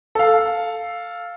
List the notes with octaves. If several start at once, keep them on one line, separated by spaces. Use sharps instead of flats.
A4 F5